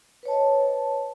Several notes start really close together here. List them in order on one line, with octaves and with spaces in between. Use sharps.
B4 C#5 A5 D#5